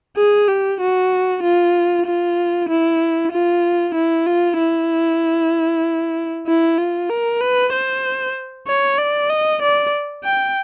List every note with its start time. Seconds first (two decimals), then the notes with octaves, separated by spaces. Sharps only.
0.17 G#4
0.48 G4
0.80 F#4
1.43 F4
2.05 F4
2.69 E4
3.32 F4
3.94 E4
4.26 F4
4.58 E4
6.47 E4
6.78 F4
7.09 A#4
7.41 B4
7.73 C5
8.67 C#5
8.98 D5
9.29 D#5
9.62 D5
10.24 G5